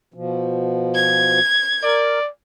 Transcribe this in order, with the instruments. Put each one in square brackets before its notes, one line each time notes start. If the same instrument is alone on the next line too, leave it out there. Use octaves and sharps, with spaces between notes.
[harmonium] B2 F3
[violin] G#6
[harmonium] A#4 [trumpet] D5